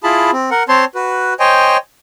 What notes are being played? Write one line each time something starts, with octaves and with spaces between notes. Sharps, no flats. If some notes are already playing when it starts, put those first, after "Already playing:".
E4 F4 G#4 A5 B5
C4
A#4 F#5
C4 C5 C#5 A5 C6
F#4 B4
C5 C#5 D#5 G5 G#5